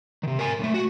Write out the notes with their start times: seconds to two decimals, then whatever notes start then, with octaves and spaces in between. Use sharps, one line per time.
0.23 C3 D#3
0.39 A#4 G#5
0.59 B1 A3
0.74 F#4